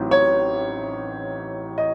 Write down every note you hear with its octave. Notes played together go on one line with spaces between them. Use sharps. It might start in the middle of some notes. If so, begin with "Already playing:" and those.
Already playing: A1 A2 F#3 C4 D#4
C#5
D#5